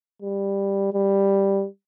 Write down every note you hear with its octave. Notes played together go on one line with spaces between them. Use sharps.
G3
G3